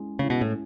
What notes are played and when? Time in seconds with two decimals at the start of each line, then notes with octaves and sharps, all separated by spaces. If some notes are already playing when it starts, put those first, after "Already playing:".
Already playing: G#3 C#4 E4
0.19 C#3 G#3 C#4 E4
0.30 B2
0.41 A2